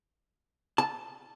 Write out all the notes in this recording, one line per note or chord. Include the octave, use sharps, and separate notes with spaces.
A5